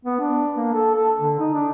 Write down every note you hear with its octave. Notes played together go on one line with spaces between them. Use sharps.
B3
D4
A#3
A4
A4
D3
D#4
D4